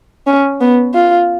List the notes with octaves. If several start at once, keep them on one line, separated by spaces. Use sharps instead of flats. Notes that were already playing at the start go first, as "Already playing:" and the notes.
C#4
B3
F4